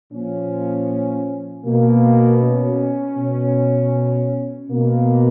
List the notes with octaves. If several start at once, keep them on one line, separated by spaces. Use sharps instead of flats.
A#2 F3 C#4
B2 A#3
C#4
B2
B2 A#3